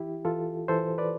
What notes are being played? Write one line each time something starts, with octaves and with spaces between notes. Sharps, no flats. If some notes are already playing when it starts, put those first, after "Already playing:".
Already playing: E3 E4 G4
E3 F4 A4
E3 A4 C5
B4 D5